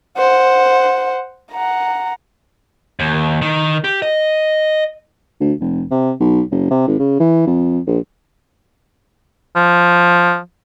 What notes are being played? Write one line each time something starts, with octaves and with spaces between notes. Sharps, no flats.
C5 F#5
F#5 A#5
D#2
D#3
G4
D#5
D2
F1
C3
B1
F#1
C3
G#1
C#3
E3
F2
A#1
F3